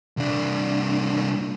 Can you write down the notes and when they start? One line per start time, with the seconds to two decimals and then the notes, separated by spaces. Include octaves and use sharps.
0.17 C2 D4